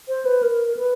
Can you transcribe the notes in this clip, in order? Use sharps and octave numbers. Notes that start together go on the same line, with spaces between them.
C5
B4
A#4
B4